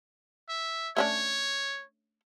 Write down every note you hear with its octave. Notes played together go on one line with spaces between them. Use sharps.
E5
A3 C#4 D4 C#5